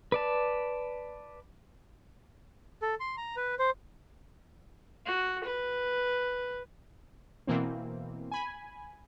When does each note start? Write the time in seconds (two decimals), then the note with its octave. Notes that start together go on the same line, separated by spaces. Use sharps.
0.12 B4 D5 A5
2.82 A4
3.00 C6
3.17 A#5
3.36 B4
3.59 C5
5.06 F#4
5.44 B4
7.47 B2 E3 A#3 C4
8.32 G#5 B5